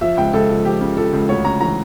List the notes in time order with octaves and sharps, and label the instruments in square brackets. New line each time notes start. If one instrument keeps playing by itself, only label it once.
[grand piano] F3 E5
C#2 G5
C#2 A4
F3
F3 G4
C#3
F3 A4
C#2
D2 C#5
C#3 A#5
E3 A#5